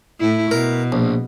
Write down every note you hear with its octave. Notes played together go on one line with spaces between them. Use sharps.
A2 E4
B2 A#4
A#1